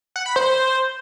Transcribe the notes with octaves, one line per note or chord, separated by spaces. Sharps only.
F#5
B5
C5